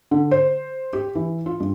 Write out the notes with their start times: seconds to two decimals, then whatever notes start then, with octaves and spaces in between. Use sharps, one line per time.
0.11 D3
0.31 C5
0.93 G4
1.15 E3
1.46 F4
1.60 G2